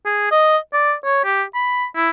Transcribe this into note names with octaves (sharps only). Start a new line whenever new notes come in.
G#4
D#5
D5
C#5
G4
B5
E4